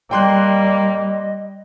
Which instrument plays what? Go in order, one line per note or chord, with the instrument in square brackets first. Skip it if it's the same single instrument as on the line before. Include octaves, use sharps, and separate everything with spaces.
[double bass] G3 [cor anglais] A#3 [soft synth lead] D#5 [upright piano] G5 C6 F#6